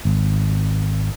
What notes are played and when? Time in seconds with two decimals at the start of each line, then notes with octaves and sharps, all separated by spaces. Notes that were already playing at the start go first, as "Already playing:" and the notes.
0.05 G#1